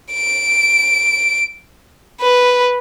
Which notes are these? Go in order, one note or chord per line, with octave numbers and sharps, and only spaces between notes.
D7
B4